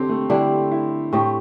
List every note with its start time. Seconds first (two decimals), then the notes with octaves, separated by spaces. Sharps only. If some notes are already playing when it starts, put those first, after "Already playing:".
Already playing: D3 C4 D4 G4 A4
0.09 A3
0.30 D3 G3 D4 E4
0.72 E4
1.13 A2 A3 C4 G4